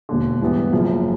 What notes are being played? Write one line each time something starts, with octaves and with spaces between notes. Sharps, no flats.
E1 D#2 D3
G#2 E3 G3 B3
F#1 F#2 C#3 F3